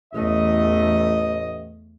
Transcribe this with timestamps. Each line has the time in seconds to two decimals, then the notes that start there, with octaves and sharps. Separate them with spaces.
0.14 A1 E2 A3 D#5